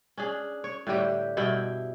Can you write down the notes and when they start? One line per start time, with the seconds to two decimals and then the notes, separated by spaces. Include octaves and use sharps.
0.18 C#4 D4 G#4
0.64 C#5
0.87 A2 D3 G3 G4
1.37 G2 B2 E4 G5